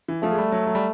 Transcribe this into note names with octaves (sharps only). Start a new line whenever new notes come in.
E3
F3 A3
G#3
G3
F#3
F#3
G3